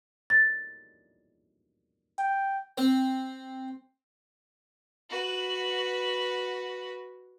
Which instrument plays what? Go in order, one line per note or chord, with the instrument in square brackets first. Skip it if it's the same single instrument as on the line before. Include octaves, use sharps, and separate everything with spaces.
[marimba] A6
[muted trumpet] G5
[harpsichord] C4
[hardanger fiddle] F#4 B4